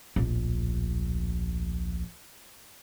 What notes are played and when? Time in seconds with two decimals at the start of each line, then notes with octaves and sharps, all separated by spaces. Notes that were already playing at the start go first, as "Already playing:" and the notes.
0.16 D1 A#1